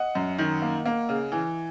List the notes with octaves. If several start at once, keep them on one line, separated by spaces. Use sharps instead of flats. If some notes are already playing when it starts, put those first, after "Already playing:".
Already playing: D#5 F#5
F#2
D#3
A#3
A#3
C#3
E3